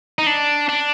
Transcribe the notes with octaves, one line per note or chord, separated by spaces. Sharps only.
D#4
D4
D4